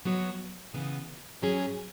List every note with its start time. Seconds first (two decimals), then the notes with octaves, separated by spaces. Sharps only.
0.05 F#3 B3 F#4 C#5
0.73 C#3 E3 B3 G#4
1.42 G#2 F#3 C#4 G#4